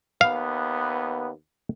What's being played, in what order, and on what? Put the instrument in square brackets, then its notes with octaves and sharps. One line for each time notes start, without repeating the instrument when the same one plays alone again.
[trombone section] D#2 B3 [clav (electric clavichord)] F5